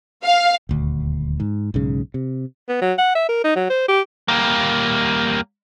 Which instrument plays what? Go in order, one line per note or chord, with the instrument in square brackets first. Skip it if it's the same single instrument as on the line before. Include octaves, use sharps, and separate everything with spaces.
[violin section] F5
[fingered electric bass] D#1 D2
G#2
B1 G#2 C#3
C3
[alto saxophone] B3
F#3
F#5
E5
A#4
D#4
F#3
C5
G4
[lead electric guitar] G3 A#3